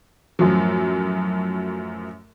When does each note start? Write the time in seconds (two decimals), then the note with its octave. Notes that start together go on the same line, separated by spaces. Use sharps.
0.39 F#2 A2 F3 F#3